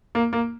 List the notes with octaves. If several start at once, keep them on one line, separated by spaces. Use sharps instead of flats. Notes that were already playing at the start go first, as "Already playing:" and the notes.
A#3
A#3